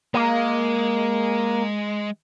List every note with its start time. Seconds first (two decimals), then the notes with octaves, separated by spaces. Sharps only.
0.14 G#3 A#3